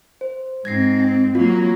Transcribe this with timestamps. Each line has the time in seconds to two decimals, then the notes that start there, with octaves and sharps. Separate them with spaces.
0.21 C5
0.65 G#2 C4 G#6 A#6 C7
1.00 G5
1.35 F#3 A#3 C4 F4